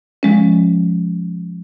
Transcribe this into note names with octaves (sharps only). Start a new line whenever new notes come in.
F3 G#3 C#4